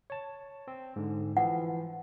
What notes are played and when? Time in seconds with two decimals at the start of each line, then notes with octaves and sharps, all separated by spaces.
0.10 C#5 A5
0.68 C4
0.96 G#2 D3
1.37 E3 F3 F#5